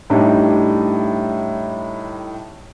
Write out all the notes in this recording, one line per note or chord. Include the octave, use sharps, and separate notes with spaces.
A2 G3 D4 D#4